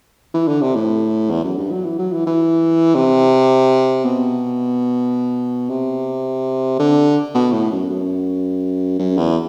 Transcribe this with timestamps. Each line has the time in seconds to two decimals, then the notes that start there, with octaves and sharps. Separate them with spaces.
0.34 E3
0.48 D3
0.61 C3
0.75 A2
1.30 E2
1.43 F#2
1.58 G2
1.71 F#3
1.85 E3
1.99 F#3
2.12 E3
2.26 E3
2.95 C3
4.05 B2
5.69 C3
6.79 D3
7.35 B2
7.53 A2
7.71 F#2
7.89 F#2
8.99 F#2
9.18 E2